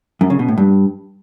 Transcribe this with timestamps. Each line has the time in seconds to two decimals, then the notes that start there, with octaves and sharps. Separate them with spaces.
0.21 F#2
0.30 C#3
0.39 B2
0.48 A2
0.58 G2